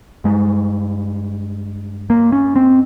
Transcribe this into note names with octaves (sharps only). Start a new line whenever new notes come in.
G2 G#3
A#3
C#4
C4